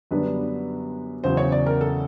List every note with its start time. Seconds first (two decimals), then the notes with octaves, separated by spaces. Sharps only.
0.11 F#2 D3 G3 B3 D4 B4
1.24 E2 C#3 F#3 C5
1.37 C#5
1.52 D5
1.66 A#4
1.81 A4